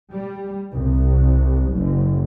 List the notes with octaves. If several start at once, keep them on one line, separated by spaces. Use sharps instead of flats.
G3
C2
F#1